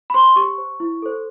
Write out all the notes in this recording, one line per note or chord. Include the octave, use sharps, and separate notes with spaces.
B5
C5 C6
G4 C#6
C5
E4
A4 C5